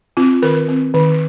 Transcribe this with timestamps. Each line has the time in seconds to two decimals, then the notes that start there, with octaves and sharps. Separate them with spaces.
0.17 C4 F4
0.42 D#3 A#4
0.68 C4
0.94 D#3